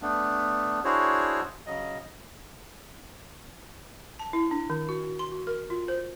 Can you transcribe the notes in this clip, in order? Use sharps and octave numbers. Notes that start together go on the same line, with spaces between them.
A3 B3 D4
D4 E4 F#4 G#4 C5 C#5
C#3 F#3 D#5
A5
E4
D4
D#3
F#4
F#4
C6
F#4
A#4
F4
C5